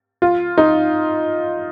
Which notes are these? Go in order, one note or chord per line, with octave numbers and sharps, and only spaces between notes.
F4
D#4